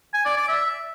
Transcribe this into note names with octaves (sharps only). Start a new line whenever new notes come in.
G#5
D5
D5
E5